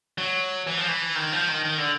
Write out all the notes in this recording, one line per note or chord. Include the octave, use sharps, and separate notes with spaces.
F#3
E3
F3
E3
D#3
F3
D#3
D#3
D3